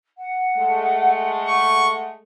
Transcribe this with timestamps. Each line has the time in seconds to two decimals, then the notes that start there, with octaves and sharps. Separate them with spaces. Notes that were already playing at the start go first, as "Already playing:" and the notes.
0.17 F#5
0.58 G#3 A3
1.48 C#6